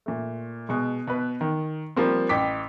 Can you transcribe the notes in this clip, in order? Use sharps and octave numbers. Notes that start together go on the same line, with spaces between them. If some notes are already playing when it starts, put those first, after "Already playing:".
A#2 A3
B2 G#3
B2 B4
D#3
F3 G3 A#3 C4
A1 G5 D6 B6